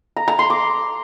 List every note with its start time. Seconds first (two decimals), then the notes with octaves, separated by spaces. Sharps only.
0.17 A#5
0.28 A#5
0.39 C6
0.50 D6